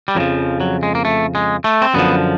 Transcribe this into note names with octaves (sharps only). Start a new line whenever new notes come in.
G3
F2 C#3 F3 F#3
F#3
G#3
A#3
A3
G#3
A3
C4
F#2 D3 F3 B3